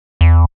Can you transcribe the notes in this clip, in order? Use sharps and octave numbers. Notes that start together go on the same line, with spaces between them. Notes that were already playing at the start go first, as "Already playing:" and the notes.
E2